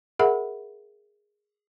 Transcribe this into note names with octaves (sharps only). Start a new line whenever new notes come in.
G#4 A#4 E5 F#5 B5